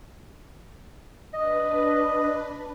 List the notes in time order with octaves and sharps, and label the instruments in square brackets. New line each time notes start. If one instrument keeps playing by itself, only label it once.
[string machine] D4 B4 [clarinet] D#5